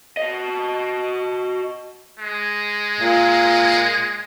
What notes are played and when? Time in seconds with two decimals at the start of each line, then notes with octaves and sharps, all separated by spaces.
0.17 F#4 D#5
2.19 G#3
3.00 A#2